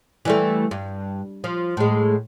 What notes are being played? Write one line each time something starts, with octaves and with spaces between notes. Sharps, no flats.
E3 G3 A3
G2
F3
A2 G#3